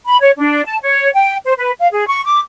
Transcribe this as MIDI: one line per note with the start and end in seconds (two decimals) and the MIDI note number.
0.06 0.17 83
0.21 0.32 73
0.38 0.62 62
0.66 0.78 81
0.82 1.09 73
1.14 1.36 79
1.45 1.53 72
1.57 1.72 71
1.80 1.87 77
1.92 2.07 68
2.07 2.21 85
2.25 2.40 86